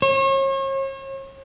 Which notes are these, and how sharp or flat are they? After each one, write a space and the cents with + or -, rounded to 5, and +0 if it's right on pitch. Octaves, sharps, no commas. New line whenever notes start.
C#5 -40